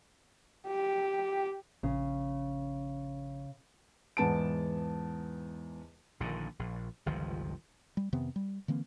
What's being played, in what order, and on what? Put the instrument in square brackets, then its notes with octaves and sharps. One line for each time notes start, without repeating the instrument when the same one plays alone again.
[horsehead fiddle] G4
[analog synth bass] A#1 [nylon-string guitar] C#3
[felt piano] E2 G#2 B3 A5 D7
[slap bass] A#1 A#2 D3 D#3
A#1
G1 C#2 D#3 F3
[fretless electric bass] G3
F2 C3 D#3 B3
G3
D3 E3 A#3 C4